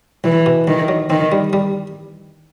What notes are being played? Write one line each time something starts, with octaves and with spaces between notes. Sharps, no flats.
B1 E3
B2
B1 D#3
F#3
D#3 C4
G3
G3